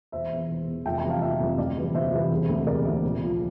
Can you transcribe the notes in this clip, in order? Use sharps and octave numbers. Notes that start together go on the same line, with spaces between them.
E1 C5 E5
E2 E3
E1
E2 E3
F1 E5 G5
G5 A#5
F2 E3 G3
F5 A5
F1 E5 G5
F2 E3 G3
D2 D5 F5
C3 E3 G3
D2 C5 E5
C3 E3 G3
E1
D2 C3
E1 A#4 D5
D2 C3
A#1
A#2 F3